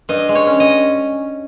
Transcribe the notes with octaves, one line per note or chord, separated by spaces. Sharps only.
G2 D#5
G#3
C#5
C#4
D#5